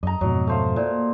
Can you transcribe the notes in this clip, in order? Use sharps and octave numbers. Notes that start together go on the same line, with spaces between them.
F#2 D#5 A#5
F2 G#2 B2 F#3
A3 C5 F5
A#2